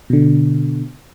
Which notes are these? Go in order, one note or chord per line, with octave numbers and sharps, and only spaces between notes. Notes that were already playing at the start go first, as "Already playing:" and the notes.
B2 D3